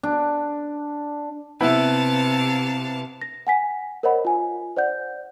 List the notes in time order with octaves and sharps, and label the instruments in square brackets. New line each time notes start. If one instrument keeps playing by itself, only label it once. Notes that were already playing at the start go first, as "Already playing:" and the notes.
[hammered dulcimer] D4
[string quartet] C3 F5 A5 [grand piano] B3 E4 B4
[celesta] A#6
F#5 G#5 B6
A#4 C5 C#5 D#5 F#5 B5
F4 G#5
C5 D5 F#5 G6